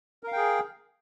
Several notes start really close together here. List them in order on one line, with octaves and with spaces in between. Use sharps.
A#4 F5 G5 G#4